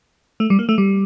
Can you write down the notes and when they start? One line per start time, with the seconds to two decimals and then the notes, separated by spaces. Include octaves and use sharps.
0.40 A3
0.50 G3
0.59 A#3
0.69 A3
0.78 G3